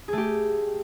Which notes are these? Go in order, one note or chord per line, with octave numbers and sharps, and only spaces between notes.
A3 G4 G#4